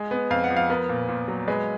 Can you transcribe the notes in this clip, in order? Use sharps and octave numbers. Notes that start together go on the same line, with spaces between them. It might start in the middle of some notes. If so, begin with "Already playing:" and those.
Already playing: G#3
B3
F2 F5
F#5
F3
F5
B3 A#4
A#2
A#2
F#3
G#3 B4